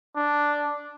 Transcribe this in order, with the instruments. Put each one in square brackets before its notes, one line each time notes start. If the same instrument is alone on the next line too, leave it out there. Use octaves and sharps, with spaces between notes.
[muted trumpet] D4